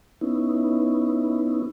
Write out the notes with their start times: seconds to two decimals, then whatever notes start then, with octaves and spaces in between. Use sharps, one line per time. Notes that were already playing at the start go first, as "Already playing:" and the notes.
0.21 B3 C#4 D#4 E4